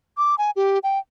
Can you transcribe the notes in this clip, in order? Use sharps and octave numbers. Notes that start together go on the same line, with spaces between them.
D6
G#5
G4
G5